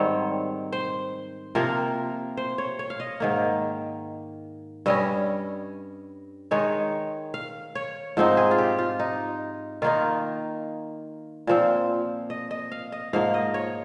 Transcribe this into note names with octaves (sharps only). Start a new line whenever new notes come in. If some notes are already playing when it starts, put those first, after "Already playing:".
Already playing: G#2 D#3 G3 C4 C#5
C5
C3 F3 A#3 A#4
C5
C#5
C#5
F5
D#5
G#2 D#3 A#3
G2 G3 C#4 D#5
D#3 G#3 D#4 C#5
F5
C#5
G#2 F3 C4 D#4
G#4
F4
G4
F4
D#4
D#3 A#3 D#4 F4
A#2 F3 C4
D#5
D#5
F5
D#5
G#2 F3 A#3 F5
D#5
C#5